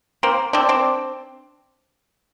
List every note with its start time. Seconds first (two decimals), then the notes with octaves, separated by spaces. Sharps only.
0.23 A#3 C4
0.53 C4 D4
0.69 C4 D4